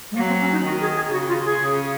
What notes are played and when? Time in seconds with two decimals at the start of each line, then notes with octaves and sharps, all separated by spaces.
0.11 G#3
0.16 F#3 A#3
0.28 C4
0.40 C#4
0.52 D#4
0.64 D#3 F#4
0.81 G#4
0.96 G#4
1.07 G#4
1.12 C#3 F#4
1.28 F4
1.45 G#4
1.60 C#3